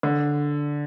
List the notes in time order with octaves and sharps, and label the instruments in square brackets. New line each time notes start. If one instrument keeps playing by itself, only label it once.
[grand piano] D3